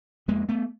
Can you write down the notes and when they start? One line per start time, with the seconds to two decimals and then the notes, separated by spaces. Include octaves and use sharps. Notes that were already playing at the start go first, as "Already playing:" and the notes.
0.28 F2 G#3 A#3
0.49 A3 B3